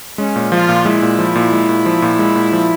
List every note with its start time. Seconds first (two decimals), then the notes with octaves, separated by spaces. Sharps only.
0.18 G#3 C#4
0.36 A#2
0.52 F3 F4
0.69 A#2
0.85 G#3 E4
1.02 A#2
1.19 F3
1.35 A#2
1.52 G#3
1.69 A#2
1.86 F3
2.02 A#2
2.19 G#3
2.36 A#2
2.53 F3